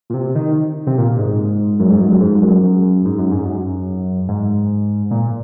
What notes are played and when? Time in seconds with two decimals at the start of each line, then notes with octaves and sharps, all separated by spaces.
0.10 A#2
0.14 C3
0.35 D#3
0.87 C3
0.98 A#2
1.19 G#2
1.80 F#2
1.90 G#2
2.01 F#2
2.12 F#2
2.21 G#2
2.42 F#2
2.63 F#2
3.05 G#2
3.18 F#2
3.31 G#2
3.45 F#2
4.28 G#2
5.11 A#2